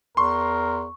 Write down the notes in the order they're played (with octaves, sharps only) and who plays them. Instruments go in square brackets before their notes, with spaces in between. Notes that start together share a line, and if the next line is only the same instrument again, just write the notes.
[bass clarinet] E2 [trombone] A#4 [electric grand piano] C6 [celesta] C#6